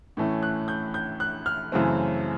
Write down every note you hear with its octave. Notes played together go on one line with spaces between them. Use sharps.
A2 E3 A3 C#4
F#6
G6
G6
F#6
F6
F#2 C#3 E3 A3 C4